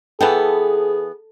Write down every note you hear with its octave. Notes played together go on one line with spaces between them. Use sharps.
E3 B3 G#4 A4 G5